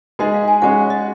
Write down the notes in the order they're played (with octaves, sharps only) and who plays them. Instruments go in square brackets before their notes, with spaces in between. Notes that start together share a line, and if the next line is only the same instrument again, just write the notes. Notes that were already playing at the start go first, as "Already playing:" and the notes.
[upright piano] G#3 D#4 G#4 [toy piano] D#5
[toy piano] F5
G#5
[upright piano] G#3 C#4 F#4 [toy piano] F#5
[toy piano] F5
D#5